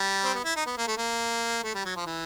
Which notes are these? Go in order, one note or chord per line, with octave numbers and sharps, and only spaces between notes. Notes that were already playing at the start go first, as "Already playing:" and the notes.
Already playing: G3
C4
B3
E4
D#4
B3
A#3
A3
A#3
A3
G3
F#3
F3
E3